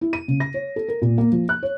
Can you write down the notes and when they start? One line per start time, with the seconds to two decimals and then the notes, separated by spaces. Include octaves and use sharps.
0.01 E4
0.13 D#7
0.28 C#3
0.40 A#6
0.54 C#5
0.76 A4
0.88 A#4
1.02 A#2
1.18 A#3
1.32 F3
1.49 F#6
1.63 C#5